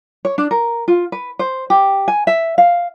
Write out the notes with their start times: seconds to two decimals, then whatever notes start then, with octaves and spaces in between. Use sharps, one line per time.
0.25 C#5
0.38 D4
0.51 A#4
0.88 F4
1.12 B4
1.39 C5
1.70 G4
2.08 G#5
2.27 E5
2.58 F5